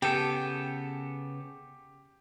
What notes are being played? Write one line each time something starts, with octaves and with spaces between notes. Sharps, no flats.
C#3 B3 G4 A4 G5